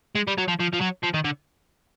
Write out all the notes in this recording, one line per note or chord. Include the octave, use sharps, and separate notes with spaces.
G#3
G3
F#3
F3
F3
F3
F#3
F3
D#3
D3